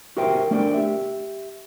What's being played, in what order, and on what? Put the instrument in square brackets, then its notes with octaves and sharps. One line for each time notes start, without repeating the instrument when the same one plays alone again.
[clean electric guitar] F#4 G4 A#4 C5 E5 G5
A3 D4 A#4 D5 G5
G4 E5